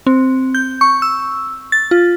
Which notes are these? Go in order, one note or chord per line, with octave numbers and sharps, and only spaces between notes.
C4
G6
C#6
E6
A6
F4